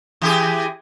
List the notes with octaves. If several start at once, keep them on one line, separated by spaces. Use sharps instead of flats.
E3 G4 G#4